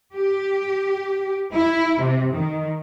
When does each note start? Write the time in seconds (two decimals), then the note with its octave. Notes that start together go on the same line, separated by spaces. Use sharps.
0.16 G4
1.55 E4
2.00 C3
2.33 D#3